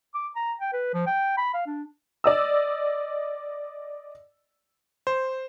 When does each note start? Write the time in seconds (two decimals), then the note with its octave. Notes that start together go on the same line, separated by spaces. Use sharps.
0.15 D6
0.36 A#5
0.60 G5
0.73 B4
0.94 F3
1.07 G5
1.37 B5
1.54 F5
1.66 D4
2.24 D5 D#5 E6
5.07 C5